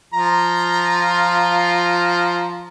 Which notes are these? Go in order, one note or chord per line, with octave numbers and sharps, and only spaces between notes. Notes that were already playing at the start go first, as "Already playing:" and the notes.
F3 F4 A#5